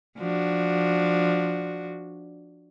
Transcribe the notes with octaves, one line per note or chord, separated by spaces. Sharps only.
F3 D4 F#4